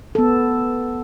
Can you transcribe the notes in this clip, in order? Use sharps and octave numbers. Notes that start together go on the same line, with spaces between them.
B3 A4